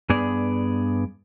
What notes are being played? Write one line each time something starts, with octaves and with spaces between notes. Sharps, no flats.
G2 B3 G#4 D5